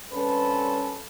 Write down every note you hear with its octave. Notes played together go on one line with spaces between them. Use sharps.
G2 C4 C#4 A4 B4